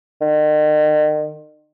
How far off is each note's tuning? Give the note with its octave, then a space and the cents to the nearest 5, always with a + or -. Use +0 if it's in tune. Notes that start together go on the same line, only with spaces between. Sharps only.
D#3 -40